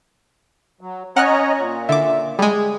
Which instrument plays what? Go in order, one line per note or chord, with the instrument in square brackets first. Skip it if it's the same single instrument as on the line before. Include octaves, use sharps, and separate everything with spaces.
[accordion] F#3
[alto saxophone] C#4 [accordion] C#5 D#5 A#5 [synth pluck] F#5 F6 F#6
[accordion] A#2
[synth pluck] D3 D6 [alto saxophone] E5
[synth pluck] G3 G#3 [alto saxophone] G#4